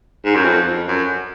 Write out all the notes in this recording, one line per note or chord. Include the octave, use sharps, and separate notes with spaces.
G#2
F#2
F2
F2
F#2